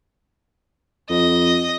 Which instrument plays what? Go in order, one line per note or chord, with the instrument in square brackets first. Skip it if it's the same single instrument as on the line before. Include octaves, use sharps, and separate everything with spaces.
[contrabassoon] F2 [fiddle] D#5